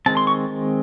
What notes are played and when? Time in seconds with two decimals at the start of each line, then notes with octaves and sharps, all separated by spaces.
0.06 D#3 G#3 C4 A5
0.17 C6
0.27 C#6